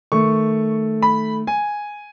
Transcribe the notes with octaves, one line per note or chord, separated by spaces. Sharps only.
D#3 A3 C#6
B5
G#5